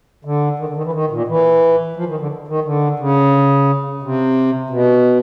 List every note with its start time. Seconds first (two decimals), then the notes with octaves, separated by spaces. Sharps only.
0.25 D3
0.59 D#3
0.68 D3
0.76 D#3
0.85 E3
0.93 D#3
1.10 A#2
1.28 E3
1.96 F3
2.08 D#3
2.19 D3
2.48 D#3
2.64 D3
2.99 C#3
4.03 C3
4.70 B2